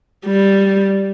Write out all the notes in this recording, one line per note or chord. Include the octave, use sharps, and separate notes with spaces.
G3